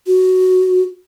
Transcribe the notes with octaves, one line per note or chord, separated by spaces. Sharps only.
F#4